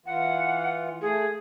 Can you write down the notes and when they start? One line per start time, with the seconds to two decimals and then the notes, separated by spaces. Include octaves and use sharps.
0.06 E3 F4 F#5
1.01 A3 G#4